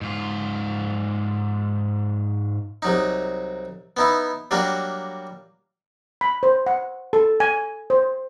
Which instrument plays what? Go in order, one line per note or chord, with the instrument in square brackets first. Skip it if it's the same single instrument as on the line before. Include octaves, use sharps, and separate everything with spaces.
[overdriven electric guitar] G#2 F4
[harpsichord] C2 F#3 D#4
B3 D#4 E4
F#3 G3 A#3 D4 F#4
[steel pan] B5
C5
F#5
A4
G#5
C5